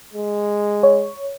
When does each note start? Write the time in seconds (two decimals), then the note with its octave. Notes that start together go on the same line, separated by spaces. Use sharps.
0.13 G#3
0.83 C#5